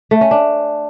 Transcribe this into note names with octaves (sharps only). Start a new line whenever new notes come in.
A3
C#4
D4